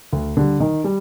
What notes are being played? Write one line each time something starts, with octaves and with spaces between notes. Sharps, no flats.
D2
D3 G3
D#3
G3